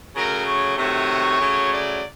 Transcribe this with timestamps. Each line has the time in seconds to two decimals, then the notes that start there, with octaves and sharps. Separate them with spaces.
0.15 C#3 F#3 A3 A#4
0.46 C#5
0.77 C3 D#3 F#3 A3 C#5
1.40 C#3 F#3 A3
1.72 D5